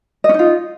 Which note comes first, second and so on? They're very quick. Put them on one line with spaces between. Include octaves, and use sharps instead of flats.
D#5 C#4 D#4 F4